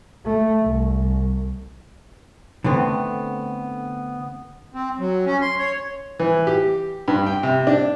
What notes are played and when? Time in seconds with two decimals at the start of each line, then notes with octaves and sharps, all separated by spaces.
0.25 A3
0.62 C2
2.64 D3 A3 B3 C4
4.74 C4
4.99 F#3
5.26 C#4
5.41 C6
5.58 C#5
6.20 E3
6.47 G4
7.08 G2
7.26 G5
7.43 C3
7.67 D4